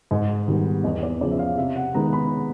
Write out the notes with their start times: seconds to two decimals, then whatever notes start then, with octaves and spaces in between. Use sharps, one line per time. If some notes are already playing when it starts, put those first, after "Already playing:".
0.11 G#2 D#5
0.48 D#3 G3 B3
0.84 E2 D#5
1.03 D5
1.21 C#3 F3 D5
1.31 E5
1.39 F5
1.57 C3 E5
1.76 F#5
1.94 D#3 G#3 B3 A#5
2.13 B5